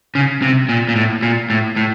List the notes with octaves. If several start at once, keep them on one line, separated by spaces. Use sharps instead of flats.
C#3
C3
A#2
A#2
A2
A#2
A2
A2